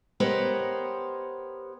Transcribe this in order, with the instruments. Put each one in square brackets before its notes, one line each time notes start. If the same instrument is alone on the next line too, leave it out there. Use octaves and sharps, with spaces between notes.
[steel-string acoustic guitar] B3 G4 A#4 C5 C#5 D#5